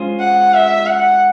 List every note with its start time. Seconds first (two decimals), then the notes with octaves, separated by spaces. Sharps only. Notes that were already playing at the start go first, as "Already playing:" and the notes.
Already playing: G#3 C#4 F4 G#4 C5
0.20 F#5
0.54 E5
0.87 F#5